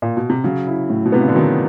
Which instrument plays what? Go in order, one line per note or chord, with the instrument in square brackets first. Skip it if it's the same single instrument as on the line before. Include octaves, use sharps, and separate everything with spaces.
[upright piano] A#2
B2
C3
[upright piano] C#3 [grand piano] F#3
[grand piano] E4
A2
[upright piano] B2
[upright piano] C3 [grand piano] B3
[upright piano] C#3
D3
[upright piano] D#3 [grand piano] F#3